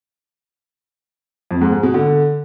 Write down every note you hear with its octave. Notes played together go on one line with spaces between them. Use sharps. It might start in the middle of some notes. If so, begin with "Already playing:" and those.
F2
G#2
G#2
B2
D3